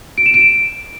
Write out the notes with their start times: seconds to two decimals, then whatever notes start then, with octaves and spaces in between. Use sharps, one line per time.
0.18 D7
0.26 E7
0.34 D7